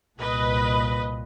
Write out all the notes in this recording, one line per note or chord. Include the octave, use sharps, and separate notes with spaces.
C2 A#2 B4 D#5